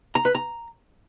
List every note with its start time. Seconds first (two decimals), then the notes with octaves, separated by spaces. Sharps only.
0.15 A#5
0.25 B4
0.35 A#5